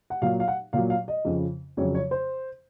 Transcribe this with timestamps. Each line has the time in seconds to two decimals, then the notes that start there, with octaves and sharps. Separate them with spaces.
0.10 F#5
0.22 A#2 F#3 F5
0.40 F5
0.48 F#5
0.73 A#2 F#3 F5
0.90 F5
1.08 D#5
1.25 F2 C#3 F3
1.77 F2 C#3 F#3 C#5
1.95 C#5
2.11 C5